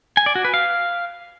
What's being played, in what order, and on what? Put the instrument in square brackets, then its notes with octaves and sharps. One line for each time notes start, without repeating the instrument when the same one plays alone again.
[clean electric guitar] G#5
D5
F#4
B4
F5